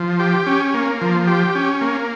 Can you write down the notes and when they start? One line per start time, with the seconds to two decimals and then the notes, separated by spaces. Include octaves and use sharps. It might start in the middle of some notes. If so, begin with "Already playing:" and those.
Already playing: F3
0.20 G4
0.47 C#4
0.74 A#3
1.02 F3
1.27 G4
1.55 C#4
1.81 A#3